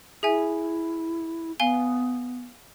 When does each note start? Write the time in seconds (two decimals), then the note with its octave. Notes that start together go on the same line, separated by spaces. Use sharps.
0.23 E4 G#4 E5 G#5
1.60 B3 F5 G#5 G7